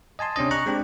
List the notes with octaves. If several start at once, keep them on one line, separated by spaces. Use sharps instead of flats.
D#5 G#5 A5 C6
C3 C#4 D4 D#5
A#5 C#6 F#6
G#3 C4 D4 G4